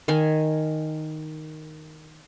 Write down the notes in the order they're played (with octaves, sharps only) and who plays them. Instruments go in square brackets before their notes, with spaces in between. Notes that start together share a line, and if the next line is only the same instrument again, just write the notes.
[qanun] D#3 G#5